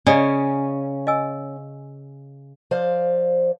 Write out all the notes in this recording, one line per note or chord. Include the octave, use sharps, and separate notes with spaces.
C#3 C#4 D5 D#5 D#6
D#5 G#5 E6
F3 C5 D5 F5